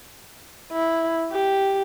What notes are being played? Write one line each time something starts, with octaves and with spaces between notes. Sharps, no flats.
E4
G4